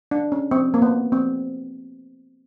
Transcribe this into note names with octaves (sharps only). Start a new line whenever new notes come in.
D4
C#4
C4
A#3
B3
C4